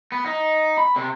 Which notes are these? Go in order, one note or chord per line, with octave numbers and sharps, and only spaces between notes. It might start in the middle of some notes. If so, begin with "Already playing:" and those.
B3
D#4
B5
C3